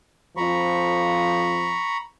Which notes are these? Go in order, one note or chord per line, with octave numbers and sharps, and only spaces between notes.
F2 F3 A#5 B5 C#6